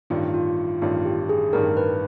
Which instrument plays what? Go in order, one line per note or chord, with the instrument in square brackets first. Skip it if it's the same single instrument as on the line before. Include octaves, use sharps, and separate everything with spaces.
[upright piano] A1 G2 D#3 [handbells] F4
[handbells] F4
F4
[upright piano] A1 G2 D#3 [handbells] F4
[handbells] G4
G#4
[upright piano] A1 G2 D#3 [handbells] A#4
[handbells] B4